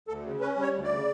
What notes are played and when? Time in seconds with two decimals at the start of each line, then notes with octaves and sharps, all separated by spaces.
0.08 D2 A4
0.23 C#3
0.41 C#4 B4
0.56 G3
0.62 C#5
0.74 D2
0.84 D5
0.89 C#3